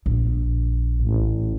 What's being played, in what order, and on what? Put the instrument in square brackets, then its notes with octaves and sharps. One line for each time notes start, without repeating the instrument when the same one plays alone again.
[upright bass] A#1
[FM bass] A1